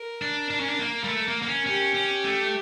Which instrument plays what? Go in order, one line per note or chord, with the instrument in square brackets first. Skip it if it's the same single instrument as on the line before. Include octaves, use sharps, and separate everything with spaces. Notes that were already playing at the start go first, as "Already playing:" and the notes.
Already playing: [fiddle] A#4
[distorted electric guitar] D4
D4
C#4
D4
A#3
G3
A3
A#3
A#3
C#4
[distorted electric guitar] C#4 [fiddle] G4
[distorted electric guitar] C#4
A3